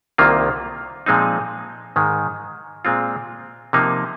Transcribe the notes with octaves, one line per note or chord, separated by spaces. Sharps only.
C2 C3 D#3 A#3 F4
A#2 F3 G#3 C4 D#4
G#2 D#3 G#3
A#2 G#3 C4 F4
C3 F3 A#3 D#4